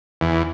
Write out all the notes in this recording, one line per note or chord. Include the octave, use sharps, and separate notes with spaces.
E2